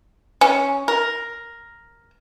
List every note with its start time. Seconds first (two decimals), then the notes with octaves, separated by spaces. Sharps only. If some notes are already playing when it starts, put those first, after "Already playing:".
0.41 C#4
0.88 A#4